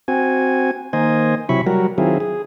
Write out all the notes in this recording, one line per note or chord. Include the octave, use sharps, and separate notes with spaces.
C4 F#4 G#5
D#3 A#3 C5 D#5 G#5
C3 F#3 E4 B5 C#6
F#3 G3 F#4 A#4
D#3 F#3 C4 E4 F4 G#4
G#4